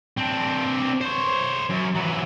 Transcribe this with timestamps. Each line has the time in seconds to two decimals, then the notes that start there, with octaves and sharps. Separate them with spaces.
0.17 C4 D4
1.01 C5 C#5
1.69 F#2
1.95 E3 F#3